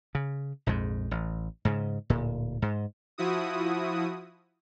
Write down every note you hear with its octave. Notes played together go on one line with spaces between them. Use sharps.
C#3
A#1 F2 G#2 G#3
A1
G#2 C#3
D1 A#2
G#2
F3 E4 F#4 D#6